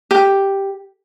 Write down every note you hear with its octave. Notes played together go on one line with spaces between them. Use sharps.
G4